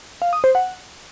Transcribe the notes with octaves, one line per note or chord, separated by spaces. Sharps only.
F5
D#6
C5
F#5